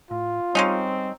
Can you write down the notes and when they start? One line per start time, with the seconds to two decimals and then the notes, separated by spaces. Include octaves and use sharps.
0.11 A2 F4
0.55 G3 G#3 C4 C#4 D#4